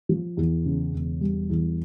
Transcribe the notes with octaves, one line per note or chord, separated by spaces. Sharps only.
F3
E2
C#3
E1
G3
E2